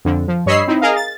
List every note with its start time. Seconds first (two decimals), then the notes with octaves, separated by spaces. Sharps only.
0.05 F2 D3
0.28 F3
0.46 G2 C#5 D#5 B5 E6 C7
0.67 C4 D#4 E4
0.82 G#4 A#4 D#5 F5
0.96 A6